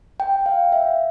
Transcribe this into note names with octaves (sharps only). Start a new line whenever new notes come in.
G5
F5
E5